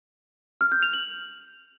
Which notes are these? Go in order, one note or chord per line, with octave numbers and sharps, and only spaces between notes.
F6
G6
F7
F#7